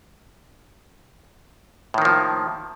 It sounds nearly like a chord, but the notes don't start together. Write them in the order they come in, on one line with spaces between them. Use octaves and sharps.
A2 D#3 A#3 F3